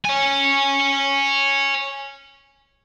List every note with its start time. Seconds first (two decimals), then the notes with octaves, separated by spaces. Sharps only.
0.05 C#5 G#5